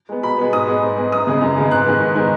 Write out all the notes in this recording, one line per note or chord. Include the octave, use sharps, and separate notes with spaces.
G#3 B3
B2 B5
G#3 B3
G#2 D#6
G#3 B3
G#2
G#3 B3
F#2 D#6
C#3 G#3 B3
F#2
C#3 G#3 B3
G#2 F#6
D#3 G#3 B3
G#2
D#3 G#3 B3